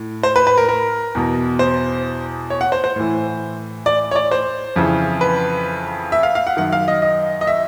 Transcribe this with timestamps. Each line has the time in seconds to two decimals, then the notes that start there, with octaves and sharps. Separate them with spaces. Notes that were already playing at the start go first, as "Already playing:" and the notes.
Already playing: A2
0.23 C5
0.36 B4
0.47 B4
0.58 A#4
0.69 A#4
1.15 E2 B2
1.59 C5
2.50 C#5
2.61 F#5
2.72 C5
2.84 C5
2.96 A2 E3
3.86 D5
4.11 C#5
4.16 D5
4.31 C5
4.76 F2 C#3 E3
5.21 B4
6.12 E5
6.23 F5
6.35 F5
6.47 F#5
6.57 F#2 D#3 F#5
6.72 F5
6.88 D#5
7.02 D#5
7.41 D#5
7.47 E5